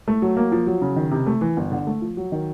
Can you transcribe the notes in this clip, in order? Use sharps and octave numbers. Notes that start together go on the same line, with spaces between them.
A3
F#3
A#3
F3
F#3
C#3
D#3
C3
A3
E3
G1
D3
A3
F3
F#3
D#3